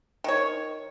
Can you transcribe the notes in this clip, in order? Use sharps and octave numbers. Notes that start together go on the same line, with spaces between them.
D#3 C#5